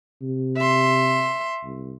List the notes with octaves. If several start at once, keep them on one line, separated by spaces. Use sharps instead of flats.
C3
E5 C6
C2